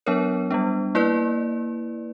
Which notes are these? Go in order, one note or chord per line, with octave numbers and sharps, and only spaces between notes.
F#3 B3 D4 A#4 C#5
G3 B3 D4
A#3 E4 B4 D5